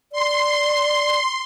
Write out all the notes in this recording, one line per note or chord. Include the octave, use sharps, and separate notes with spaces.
D5 C6